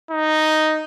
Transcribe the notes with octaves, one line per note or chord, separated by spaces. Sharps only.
D#4